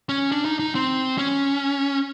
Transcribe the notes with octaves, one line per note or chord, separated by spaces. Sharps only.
C#4
D4
D#4
D#4
C4
C#4